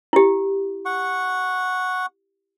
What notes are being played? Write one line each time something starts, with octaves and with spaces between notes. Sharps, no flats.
E4 G4
F#5 C#6